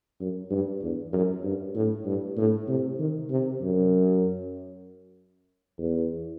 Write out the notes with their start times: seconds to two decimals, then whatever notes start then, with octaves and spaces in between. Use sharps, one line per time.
0.20 F#2
0.51 G2
0.82 E2
1.13 F#2
1.44 G2
1.75 A2
2.06 G2
2.37 A2
2.68 C3
2.99 D#3
3.30 C3
3.61 F#2
5.78 E2